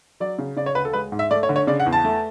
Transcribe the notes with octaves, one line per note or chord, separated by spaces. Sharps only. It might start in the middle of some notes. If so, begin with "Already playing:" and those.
F#3 D5
C#3
C#3 D5
C#5
D2 B4
A4
G#3 B4
G#2
E5
A3 D5
C#5
D3
C#5
C#3 D5
F#5
E2
A5
A3